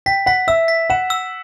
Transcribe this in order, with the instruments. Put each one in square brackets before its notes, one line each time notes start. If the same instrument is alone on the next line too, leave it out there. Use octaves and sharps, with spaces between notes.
[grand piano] G5 [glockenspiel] B6
[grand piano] F#5 [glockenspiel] B6
[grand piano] E5 [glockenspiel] E6
[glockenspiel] B6
[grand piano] F#5 [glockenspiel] E7
[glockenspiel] E6